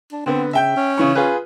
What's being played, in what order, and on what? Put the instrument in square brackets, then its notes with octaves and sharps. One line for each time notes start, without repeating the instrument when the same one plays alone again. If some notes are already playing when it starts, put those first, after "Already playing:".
[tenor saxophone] D4
[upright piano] D3 B3 [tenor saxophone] C4
[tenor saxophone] C#3 [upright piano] E5 G5 G6
[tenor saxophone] C#4
[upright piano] C#3 E3 C#6
F4 G#4 B4